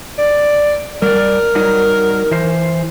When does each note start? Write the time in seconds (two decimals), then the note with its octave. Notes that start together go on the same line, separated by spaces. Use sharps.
0.18 D5
1.02 G3 A#4 D5
1.55 F#3 G3 D#4
2.31 E3 C5